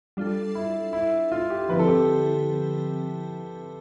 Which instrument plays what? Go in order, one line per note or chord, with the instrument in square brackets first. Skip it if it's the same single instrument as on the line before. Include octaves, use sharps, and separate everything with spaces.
[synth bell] G3 D4 F4 A4
[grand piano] E4
E4
F4
G4
[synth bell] D3 F3 C4 E4 [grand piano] B4
[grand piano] A4
G4